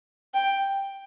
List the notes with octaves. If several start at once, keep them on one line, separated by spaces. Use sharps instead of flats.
G5